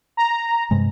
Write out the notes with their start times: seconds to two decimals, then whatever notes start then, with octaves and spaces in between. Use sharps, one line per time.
0.17 A#5
0.71 G2 C3 G#3